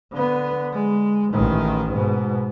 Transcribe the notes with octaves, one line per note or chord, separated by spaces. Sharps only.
D3 B3
G#3
A1 D#3
G#2 B2